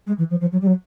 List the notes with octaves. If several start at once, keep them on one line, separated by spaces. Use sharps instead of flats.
G#3
E3
F3
F3
F#3
G3
F#3